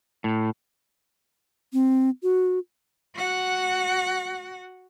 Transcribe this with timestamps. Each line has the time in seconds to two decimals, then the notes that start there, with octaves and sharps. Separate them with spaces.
0.24 A2
1.73 C4
2.23 F#4
3.15 F#4 F#5